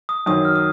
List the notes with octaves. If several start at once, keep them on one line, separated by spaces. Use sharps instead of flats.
D#6
F#2 D#3 F#3 D#6
F6
D#6